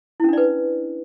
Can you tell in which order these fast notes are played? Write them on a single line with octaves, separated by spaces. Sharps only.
E4 C#4 D4 D5 B4